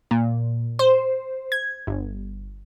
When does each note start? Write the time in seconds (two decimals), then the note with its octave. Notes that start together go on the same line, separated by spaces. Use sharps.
0.11 A#2
0.79 C5
1.52 G#6
1.87 G1